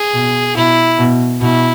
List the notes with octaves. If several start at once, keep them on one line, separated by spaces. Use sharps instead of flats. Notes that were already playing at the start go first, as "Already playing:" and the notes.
Already playing: G#4
B2
B2 E4
B2
B2 E4